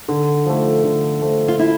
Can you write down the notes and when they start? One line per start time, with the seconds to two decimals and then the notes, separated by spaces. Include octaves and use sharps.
0.08 D3
0.46 F3 A3
0.84 D3
1.21 F3 A3
1.48 F4
1.59 E4